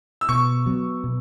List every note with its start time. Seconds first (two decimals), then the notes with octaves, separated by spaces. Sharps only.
0.21 E6
0.29 B2 C#6
0.66 F#3 B3
1.04 B2